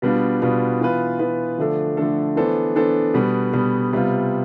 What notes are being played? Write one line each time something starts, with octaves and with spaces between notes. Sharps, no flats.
B2 G3 B3 D4 F4
B2 G3 B3 D4 F4
E3 B3 F4 B4
E3 B3 F4 B4
D3 F3 A3 D4 A4
D3 F3 A3 D4 A4
E3 B3 D4 A4 C5
E3 B3 D4 A4 C5
B2 G3 B3
B2 G3 B3
C3 G3 B3 F4